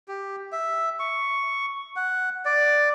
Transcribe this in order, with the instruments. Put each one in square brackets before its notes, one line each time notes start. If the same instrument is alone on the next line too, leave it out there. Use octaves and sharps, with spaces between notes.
[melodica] G4
E5
C#6
F#5
D5